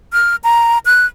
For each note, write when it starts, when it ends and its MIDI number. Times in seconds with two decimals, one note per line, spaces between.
0.13 0.36 89
0.44 0.78 82
0.85 1.06 90